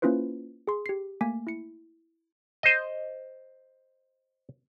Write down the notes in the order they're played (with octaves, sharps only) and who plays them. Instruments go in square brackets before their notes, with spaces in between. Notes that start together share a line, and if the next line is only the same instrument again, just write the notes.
[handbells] A#3 C#4 E4 F4 B4 C5
G#4 C6
G4 C7
A3 A#3 G#5 D6 B6
E4 C#7
[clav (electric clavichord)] C5 D#5